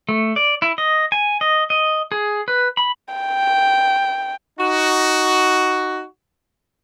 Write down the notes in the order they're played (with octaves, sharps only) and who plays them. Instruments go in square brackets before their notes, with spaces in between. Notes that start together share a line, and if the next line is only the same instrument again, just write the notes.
[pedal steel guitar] A3
D5
E4
D#5
G#5
D#5
D#5
G#4
B4
B5
[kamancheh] G5
[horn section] D#4 F#4